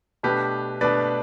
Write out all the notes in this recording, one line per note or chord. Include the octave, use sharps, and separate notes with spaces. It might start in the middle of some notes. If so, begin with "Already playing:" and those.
B2 A3 D4 G4 B4
B2 A3 D4 B4 D5